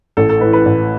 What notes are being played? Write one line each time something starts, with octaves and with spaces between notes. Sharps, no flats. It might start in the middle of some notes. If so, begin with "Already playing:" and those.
A1 A4
A4
A2 E3 B4
B4
A1